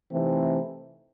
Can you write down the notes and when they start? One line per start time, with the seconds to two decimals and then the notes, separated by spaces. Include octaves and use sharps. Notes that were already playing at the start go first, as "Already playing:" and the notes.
0.11 C3 E3 A3 C4 D#4